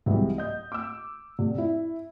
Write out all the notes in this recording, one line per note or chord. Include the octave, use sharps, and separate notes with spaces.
C2 G#2 C3 E3 F#3
D#5 G6
D6 E6
F1
E4